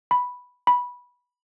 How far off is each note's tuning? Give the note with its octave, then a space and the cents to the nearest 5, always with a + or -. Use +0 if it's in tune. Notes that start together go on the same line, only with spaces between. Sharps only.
B5 +0
B5 -10